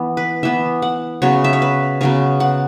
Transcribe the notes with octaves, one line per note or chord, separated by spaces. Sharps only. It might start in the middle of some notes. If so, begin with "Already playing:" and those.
Already playing: E3 B3
B4
E3 B3 E5
F#5
C#3 F#3 B3 C#5
E5
C#5
B4
C#3 F#3 B3 C#5
F#5